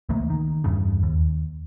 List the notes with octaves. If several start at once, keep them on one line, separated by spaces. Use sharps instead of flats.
C#2 E3 A3 A#3
D#3
E2 G2 C#3
D#2